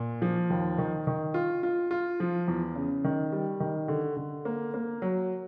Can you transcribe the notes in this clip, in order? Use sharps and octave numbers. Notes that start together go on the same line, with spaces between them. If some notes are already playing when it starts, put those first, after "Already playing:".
Already playing: A#2
F3
D#2
D#3
D#3
F4
F4
F4
F3
E2
C#3
D#3
G3
D#3
D3
D3
A#3
A#3
F#3